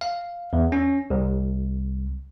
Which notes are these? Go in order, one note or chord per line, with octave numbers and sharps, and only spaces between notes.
F5
E2
C#4
C2